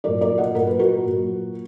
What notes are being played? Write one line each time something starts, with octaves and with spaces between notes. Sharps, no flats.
A#2 F#3 A#4 D5
A#4 D5
D#5 F#5
A#2 F#3 A#4
B4
F#4 A#4
A#2 F#3